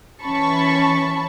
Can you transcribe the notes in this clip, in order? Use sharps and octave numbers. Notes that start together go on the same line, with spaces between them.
E3 C#4 A5 B5 C#6